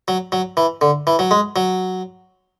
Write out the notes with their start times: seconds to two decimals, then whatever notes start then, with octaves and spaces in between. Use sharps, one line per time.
0.08 F#3
0.32 F#3
0.57 E3
0.81 D3
1.07 E3
1.19 F#3
1.31 G#3
1.56 F#3